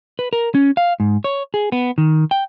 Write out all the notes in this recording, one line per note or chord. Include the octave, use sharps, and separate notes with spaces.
B4
A#4
C#4
F5
G#2
C#5
G#4
B3
D#3
G5